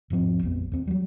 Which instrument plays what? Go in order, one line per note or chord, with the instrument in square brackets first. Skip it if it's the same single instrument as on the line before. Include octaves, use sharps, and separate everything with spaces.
[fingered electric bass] E1 G#2 F3 C4
A#1 F2 B3
D#2 C4
F#3 G3